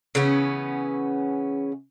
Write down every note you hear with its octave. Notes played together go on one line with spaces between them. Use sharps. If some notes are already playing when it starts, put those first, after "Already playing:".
C#3 E3 B3 C#4